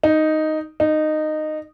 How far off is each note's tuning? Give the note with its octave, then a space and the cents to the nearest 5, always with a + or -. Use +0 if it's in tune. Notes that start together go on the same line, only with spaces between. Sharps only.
D#4 +0
D#4 -15